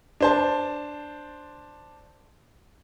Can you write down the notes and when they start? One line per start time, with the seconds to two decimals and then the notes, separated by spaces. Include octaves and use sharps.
0.20 D4 C5 A5